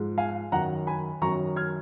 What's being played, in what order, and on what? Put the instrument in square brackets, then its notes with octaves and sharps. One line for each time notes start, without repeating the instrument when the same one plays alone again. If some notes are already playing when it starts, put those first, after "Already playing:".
Already playing: [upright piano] G#2 F3 G#3
F5 G#5
F#2 D#3 F#3 F#5 A#5
G#5 B5
F#2 D#3 F#3 A#5 C#6
F6 G#6